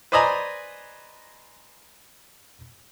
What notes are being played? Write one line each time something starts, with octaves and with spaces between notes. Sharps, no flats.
B4 C5 D5 D#5 G#5 A#5